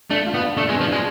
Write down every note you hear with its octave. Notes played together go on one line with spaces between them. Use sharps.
A3 D4
F4
B3
D4
A3 D4
G#3
B2
F3
G#3 D4